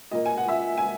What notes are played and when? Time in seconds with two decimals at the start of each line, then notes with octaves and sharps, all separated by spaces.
0.11 A#2 A#3 D#5
0.26 G#5
0.37 F#5
0.48 E5
0.77 G#5